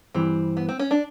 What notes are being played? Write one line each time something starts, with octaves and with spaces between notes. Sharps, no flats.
G2 E3 G3 C4
B3
C4
C#4
D4